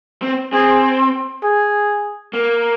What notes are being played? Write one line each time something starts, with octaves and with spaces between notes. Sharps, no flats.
C4
C4 G#4
G#4
A#3